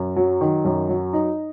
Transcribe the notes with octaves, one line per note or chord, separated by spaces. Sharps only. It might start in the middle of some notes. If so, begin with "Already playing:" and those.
Already playing: F#2
F#3
D#3
F#2
F#3
D#4